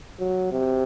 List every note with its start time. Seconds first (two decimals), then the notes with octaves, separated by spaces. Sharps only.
0.20 F#3
0.52 C3